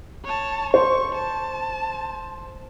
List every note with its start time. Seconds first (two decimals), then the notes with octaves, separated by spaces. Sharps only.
0.25 C#5 A5
0.74 C5 C#6
1.15 A5